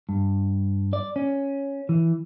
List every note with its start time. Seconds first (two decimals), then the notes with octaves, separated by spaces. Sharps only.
0.09 G2
0.93 D5
1.16 C#4
1.89 E3